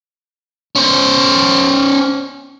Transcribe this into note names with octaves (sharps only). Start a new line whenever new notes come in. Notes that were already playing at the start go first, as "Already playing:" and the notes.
C#4 C5